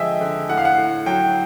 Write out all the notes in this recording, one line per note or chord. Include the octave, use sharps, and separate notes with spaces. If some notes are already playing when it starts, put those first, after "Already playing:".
Already playing: D3 F3 G#3 D#5 E5 G5 G#5
D3
A2 F#5
F5
F#5
A2
F#3 G5